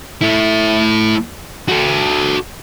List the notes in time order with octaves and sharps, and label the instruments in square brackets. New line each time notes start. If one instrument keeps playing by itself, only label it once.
[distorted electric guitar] A3 E4
F#4 A4